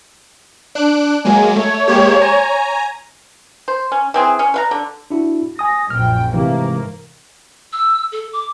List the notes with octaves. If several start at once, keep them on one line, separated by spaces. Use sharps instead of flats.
D4 F#6 D7
F#3 G#3 A#3 G#5
A3 C#5
G#3 A#3 G4
G#5 A#5
C5
C#4
E3 C4 G#4
C#4
B4 F5 A#5
D3
D4 E4 F#4
G#5 D#6 A#6
A#1 F#2 G5 F6
G#2 C3 E3 A3 A#3
E6
A4
D6